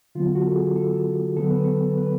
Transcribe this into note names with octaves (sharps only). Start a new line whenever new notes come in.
D3 F#3 B3 F4
F#4
A4
G#4
A4
D3 F#3 B3 A4
B4
A4
B4